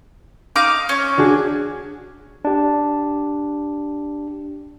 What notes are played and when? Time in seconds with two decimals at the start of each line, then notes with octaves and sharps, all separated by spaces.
0.56 D#4 F5 D6
0.89 C#4 C#5
1.17 D4 F#4 G#4
2.45 D4 G4